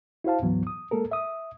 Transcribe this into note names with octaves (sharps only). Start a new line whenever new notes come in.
E4 F#4 C5 F5 A5
D2 G#2 E3 F#3 B3
D#6
G#3 A#3 A4 A#4
E5 D#6